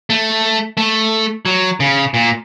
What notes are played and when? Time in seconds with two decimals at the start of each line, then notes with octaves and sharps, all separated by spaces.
0.10 A3
0.77 A3
1.45 F#3
1.80 C#3
2.14 A#2